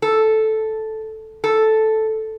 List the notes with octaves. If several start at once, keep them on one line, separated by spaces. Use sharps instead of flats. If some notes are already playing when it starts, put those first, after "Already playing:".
A4
A4